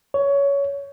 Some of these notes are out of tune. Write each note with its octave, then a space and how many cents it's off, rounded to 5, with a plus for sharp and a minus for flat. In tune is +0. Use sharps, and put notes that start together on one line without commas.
C#5 +20